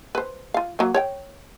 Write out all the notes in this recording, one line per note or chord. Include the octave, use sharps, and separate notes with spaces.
B4 C5
F4 F5
F#3 A#3
C#5 D5 G5